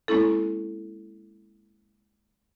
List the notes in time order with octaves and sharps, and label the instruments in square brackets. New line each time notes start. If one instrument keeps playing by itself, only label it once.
[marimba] G#3 A#3 C4 C#4 E4 A4